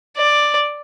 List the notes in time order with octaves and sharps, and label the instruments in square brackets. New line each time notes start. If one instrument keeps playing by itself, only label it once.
[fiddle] D5